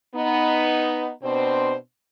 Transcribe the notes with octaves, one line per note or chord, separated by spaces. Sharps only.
B3 D#4
B2 C4 D4 C5